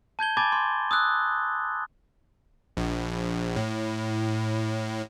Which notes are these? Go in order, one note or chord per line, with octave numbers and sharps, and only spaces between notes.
A5 G6 G#6 G7
G#5 A5 B5 D6 G#6 A6
C6
D#6 E6 F#6
A#1
A2